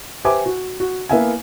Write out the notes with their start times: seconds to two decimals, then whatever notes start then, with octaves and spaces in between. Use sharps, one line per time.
0.25 G4 B4 C5 E5 G#5 D6
0.46 F#4
0.80 F#4
1.09 A#3 B3 E4 E5 F5 G#5